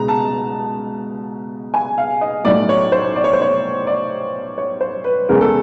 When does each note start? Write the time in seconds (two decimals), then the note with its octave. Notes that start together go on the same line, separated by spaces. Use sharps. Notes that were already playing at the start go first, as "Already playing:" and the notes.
Already playing: C#2 B2 G#3 A#5
0.08 A5
1.74 G#5
1.98 F5
2.21 D#5
2.44 B1 A2 F#3 A3 D5
2.69 C#5
2.92 C5
3.16 D5
3.24 C#5
3.33 C5
3.42 C#5
3.87 D5
4.58 C#5
4.81 C5
5.04 B4
5.29 E2 C#3 E3 G#3 A#4
5.41 A4